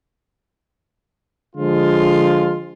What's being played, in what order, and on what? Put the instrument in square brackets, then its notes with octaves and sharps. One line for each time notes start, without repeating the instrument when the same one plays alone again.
[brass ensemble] D3 F3 G#3 F4